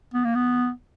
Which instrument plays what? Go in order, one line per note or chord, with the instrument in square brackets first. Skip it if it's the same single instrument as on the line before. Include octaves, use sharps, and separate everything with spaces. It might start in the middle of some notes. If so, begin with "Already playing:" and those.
[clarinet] B3
A#3
B3